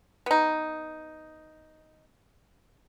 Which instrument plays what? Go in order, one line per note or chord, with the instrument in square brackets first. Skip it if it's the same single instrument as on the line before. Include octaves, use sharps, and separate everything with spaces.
[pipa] B3 D#4